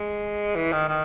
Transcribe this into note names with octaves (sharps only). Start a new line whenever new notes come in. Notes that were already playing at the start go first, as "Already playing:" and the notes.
Already playing: G#3
E3
D#3
D#3